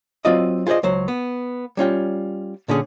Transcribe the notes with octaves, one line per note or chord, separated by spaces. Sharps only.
F#3 C4 F4 D5 D#5
F4 G#4 C5 D5 D#5
C#2 F#3 C5
B3
G3 C#4 F4 G5
A#2 D3 C#4 G#4